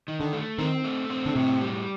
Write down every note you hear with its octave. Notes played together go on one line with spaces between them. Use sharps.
D#3
D3
A3
D#3 C4
A3
C4
D3
A2 C3
G3